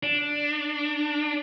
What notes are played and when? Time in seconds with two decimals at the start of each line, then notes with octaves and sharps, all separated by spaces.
0.03 D4